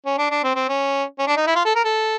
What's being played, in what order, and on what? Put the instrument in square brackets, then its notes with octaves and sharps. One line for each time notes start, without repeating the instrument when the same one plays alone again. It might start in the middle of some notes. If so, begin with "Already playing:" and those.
[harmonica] C#4
D4
D4
C4
C4
C#4
C#4
D4
D#4
E4
F4
A4
A#4
A4